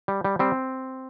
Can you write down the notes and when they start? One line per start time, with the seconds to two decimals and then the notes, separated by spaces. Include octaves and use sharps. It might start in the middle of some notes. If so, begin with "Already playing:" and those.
0.08 G3
0.24 G3
0.39 G3 C4